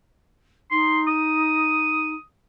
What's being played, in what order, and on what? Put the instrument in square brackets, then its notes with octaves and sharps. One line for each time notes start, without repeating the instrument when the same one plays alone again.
[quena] D#4 [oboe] C6
[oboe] D#6